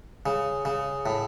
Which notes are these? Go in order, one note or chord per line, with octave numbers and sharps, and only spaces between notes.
C#3
C#3
A2